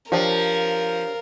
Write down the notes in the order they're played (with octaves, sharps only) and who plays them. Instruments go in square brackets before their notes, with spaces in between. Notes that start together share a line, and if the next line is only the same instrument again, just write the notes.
[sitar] F3 [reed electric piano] D4 G4 C#5 [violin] A#4